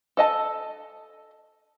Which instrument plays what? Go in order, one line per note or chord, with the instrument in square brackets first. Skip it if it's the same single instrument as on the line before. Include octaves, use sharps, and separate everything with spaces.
[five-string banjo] A4 D#5 A5